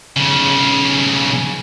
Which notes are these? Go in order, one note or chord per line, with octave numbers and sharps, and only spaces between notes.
B1 C#3